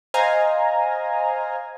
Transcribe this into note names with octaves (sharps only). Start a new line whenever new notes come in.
C5 D#5 F5 G#5 A#5